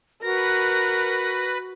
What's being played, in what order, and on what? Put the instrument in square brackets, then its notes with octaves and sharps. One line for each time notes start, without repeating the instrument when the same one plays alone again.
[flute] F#4 [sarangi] A#4 [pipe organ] B4 [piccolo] A#6